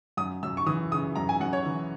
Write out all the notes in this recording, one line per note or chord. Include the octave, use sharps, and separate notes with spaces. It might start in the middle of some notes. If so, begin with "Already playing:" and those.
F#2 D#6
F#2 E6
C#6
E3 D#6
C#3 D#6
F#2 A#5
G#5
F#2 F#5
C#5
E3